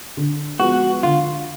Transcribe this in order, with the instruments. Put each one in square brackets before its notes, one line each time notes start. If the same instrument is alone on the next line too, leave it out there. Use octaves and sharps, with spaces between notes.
[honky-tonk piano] D3
[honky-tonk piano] F3 G#3 B3 [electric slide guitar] F#4
[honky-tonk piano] D3 [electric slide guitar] F4